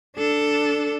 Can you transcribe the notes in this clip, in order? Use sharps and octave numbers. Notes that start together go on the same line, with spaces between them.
D4 A4